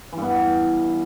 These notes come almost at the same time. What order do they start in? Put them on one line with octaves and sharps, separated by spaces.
E3 G2 B3